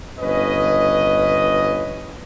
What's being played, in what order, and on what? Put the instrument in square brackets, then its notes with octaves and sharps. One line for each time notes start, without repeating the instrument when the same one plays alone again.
[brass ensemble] G1 C#4 B4 D#5